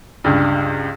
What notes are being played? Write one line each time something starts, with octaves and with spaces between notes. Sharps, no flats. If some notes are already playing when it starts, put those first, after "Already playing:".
C#2 G2